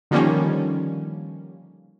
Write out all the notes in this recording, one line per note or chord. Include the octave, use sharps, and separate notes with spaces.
D3 D#3 F3 G3 A#3 C#4